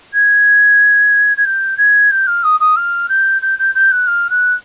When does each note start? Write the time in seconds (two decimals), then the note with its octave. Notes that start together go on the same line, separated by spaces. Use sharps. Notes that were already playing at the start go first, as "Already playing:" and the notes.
0.13 G#6
1.37 G#6
1.45 G6
1.77 G#6
2.10 G6
2.27 F6
2.43 D#6
2.60 D#6
2.76 F6
3.09 G6
3.41 G6
3.59 G6
3.74 G6
3.91 F#6
4.07 F6
4.30 F#6